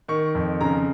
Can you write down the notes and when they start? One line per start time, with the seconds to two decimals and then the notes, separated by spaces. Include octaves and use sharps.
0.08 D#3 C#6
0.35 F2
0.61 C#3 A#5